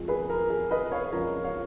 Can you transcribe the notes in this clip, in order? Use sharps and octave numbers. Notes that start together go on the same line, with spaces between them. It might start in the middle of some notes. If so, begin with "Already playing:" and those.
Already playing: F2 F3 G#3
G#4 B4
A#4
G#4
B4 D#5
C#5 F5
F2 C#3 F3 G#3 A#4 C#5
C#5 F5